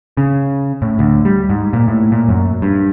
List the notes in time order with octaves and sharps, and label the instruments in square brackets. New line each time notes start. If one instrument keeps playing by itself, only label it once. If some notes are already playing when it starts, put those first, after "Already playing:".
[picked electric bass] C#3
A2
D2
G3
G#2
A#2
A2
A#2
F#2
G2